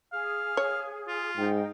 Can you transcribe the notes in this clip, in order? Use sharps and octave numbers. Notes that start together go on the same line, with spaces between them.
G#4 F5
C#5
F4
G#2 D#4 G5